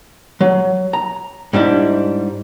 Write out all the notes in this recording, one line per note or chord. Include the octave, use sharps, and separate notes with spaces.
F#3
A#5
G#2 G3 D4 E4